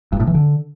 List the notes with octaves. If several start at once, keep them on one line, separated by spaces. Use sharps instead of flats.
G2
A2
E3
D3